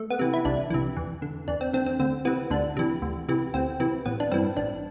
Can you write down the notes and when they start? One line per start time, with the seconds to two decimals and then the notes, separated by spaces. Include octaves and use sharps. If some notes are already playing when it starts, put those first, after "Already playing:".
Already playing: A3
0.10 B3
0.19 C3 E3
0.34 E4
0.45 C2 D4
0.70 C3 E3
0.97 E2
1.22 D3
1.48 E2 D4
1.61 C4
1.73 D3 C4
1.86 C4
2.00 D2 C4
2.25 C3 E3 B3
2.51 D2 D4
2.77 C3 E3
3.02 D2
3.29 C3 E3
3.54 D2 C4
3.80 C3 E3
4.06 A1 B3
4.20 D4
4.32 G2 E3 C4
4.57 A1 D4